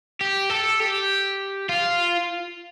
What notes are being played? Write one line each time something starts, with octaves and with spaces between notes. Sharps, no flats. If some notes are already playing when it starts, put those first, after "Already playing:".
G4
A4
G4
F4